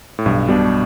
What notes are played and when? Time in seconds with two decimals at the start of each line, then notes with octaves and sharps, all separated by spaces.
0.19 A2
0.26 B1 G2
0.48 B2 G3 D4